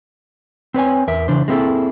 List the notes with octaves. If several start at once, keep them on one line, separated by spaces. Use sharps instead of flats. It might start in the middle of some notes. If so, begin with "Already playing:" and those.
C4 B4 C#5 G#5
E2 A#4 E5
C#3 E3 D4 C5
G#3 A#3 C4 E4 G#4 A4